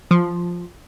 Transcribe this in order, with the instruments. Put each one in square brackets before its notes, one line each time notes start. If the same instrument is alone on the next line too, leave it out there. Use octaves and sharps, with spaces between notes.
[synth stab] F3